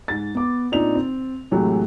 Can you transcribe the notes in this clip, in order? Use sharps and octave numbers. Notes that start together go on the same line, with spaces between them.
G#2 A6
B3 D6
A#2 C4 D4 D#4 F7
C4
A2 C3 E3 F#3 G#3 A3